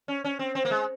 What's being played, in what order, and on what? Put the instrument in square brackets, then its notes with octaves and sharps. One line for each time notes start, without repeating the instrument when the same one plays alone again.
[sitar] C#4
C#4
C4
C4
A#3
G#3